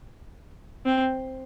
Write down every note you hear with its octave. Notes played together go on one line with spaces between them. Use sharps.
C4